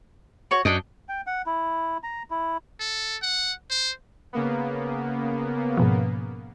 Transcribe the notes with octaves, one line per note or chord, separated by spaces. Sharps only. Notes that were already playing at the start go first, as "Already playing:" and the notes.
F#4 C#5
F#2 D4 D#5
G5
F#5
E4
A#5
E4
A4
F#5
C5
C#3 A#3 B3
G#2 B2 F3